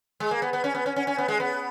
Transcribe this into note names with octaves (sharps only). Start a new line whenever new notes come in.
G#3
A#3
B3
B3
C#4
B3
C#4
C#4
C#4
B3
G#3
B3